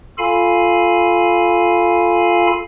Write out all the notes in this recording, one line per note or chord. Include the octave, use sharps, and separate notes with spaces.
F4 A4 F5 G#5 B5